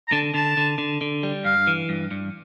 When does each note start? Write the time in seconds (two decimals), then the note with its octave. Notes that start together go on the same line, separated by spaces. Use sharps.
0.08 A#5
0.12 D3 A5
0.34 D3 A5
0.57 D3
0.78 D3
1.01 D3
1.23 G3
1.45 G2 F5
1.67 E3
1.89 G2
2.11 G2